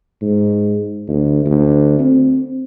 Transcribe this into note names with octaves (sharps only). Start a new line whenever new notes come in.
G#2
D2
D2
C4